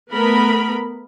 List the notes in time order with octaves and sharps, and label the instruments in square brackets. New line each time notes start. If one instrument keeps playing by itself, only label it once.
[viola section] A3 B3 A#4 B5